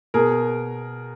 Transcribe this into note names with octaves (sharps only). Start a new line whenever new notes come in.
B2 G#4 A#4